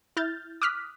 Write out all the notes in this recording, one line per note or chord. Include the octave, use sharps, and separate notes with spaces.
E4 F6 G6 A6
D6 D#6 F6 F#6 B6